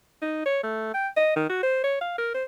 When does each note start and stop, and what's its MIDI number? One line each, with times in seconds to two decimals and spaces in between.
0.22 0.44 63
0.46 0.60 73
0.64 0.89 57
0.94 1.08 79
1.17 1.33 75
1.36 1.48 51
1.50 1.59 66
1.63 1.83 72
1.84 1.97 73
2.01 2.17 77
2.18 2.29 70
2.34 2.44 72